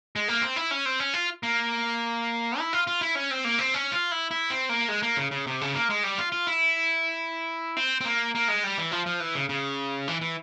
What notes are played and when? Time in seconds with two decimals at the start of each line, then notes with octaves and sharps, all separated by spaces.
0.16 G#3
0.28 A#3
0.42 C4
0.56 E4
0.71 C#4
0.86 C4
1.00 C#4
1.14 F4
1.43 A#3
2.59 E4
2.73 F4
2.87 F4
3.01 E4
3.15 C#4
3.31 C4
3.44 A#3
3.59 C4
3.74 C#4
3.92 F4
4.12 E4
4.31 E4
4.50 C4
4.69 A#3
4.88 G#3
5.03 A#3
5.17 C#3
5.31 C#3
5.47 C3
5.61 C#3
5.74 A#3
5.90 G#3
6.04 G3
6.18 F4
6.32 F4
6.47 E4
7.77 C4
8.01 C4
8.05 A#3
8.35 A#3
8.48 G#3
8.64 G3
8.78 E3
8.91 F3
9.06 F3
9.20 E3
9.35 C#3
9.49 C#3
10.08 E3
10.21 E3